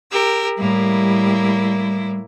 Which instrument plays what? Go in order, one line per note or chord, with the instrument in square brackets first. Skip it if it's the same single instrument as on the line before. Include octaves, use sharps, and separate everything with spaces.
[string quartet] G4 A#4 E6
[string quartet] A2 A#3 E4 [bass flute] G3